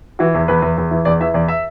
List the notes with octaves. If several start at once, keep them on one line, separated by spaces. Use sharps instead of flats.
E3 F#4
E2
E2 B4
E2
E2
E3
E2 D5
E3 E5
E2 D5
E5